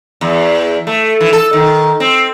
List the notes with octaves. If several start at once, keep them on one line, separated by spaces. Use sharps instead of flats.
E2
A3
E3
A4
D#3
C4